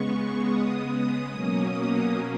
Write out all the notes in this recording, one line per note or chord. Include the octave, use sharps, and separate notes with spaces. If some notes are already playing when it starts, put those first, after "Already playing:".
Already playing: C#3 G#3 B3 C#6
D#6
D#6
B2 F#3 A#3 C#4